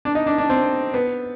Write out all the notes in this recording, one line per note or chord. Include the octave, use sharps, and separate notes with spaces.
D4
D#4
D4
D4
C4
B3